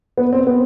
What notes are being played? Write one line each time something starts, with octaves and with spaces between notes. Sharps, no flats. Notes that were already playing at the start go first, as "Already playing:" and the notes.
B3
C4
B3